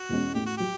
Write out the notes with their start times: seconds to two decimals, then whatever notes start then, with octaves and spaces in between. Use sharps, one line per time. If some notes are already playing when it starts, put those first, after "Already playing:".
Already playing: F#4
0.09 E2 B2 G#3 C#4
0.35 A2 G4
0.46 F#4
0.57 F#3 G4